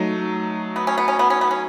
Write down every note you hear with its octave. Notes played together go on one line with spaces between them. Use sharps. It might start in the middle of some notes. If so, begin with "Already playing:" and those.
Already playing: F#3 A3 D#4
B3
C#4
B3
C#4
B3
C#4
B3
C#4